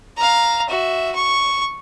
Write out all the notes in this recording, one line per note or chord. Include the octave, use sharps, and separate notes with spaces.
F5 A#5
F#4 E5
C#6